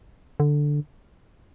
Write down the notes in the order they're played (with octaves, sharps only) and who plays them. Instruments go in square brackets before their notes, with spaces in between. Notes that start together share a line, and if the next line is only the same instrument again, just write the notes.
[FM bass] D3